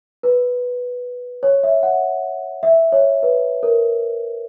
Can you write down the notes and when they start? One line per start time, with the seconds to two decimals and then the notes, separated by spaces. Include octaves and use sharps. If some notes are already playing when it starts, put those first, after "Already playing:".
0.23 B4
1.43 C#5
1.63 E5
1.83 F#5
2.63 E5
2.92 C#5
3.23 B4
3.63 A#4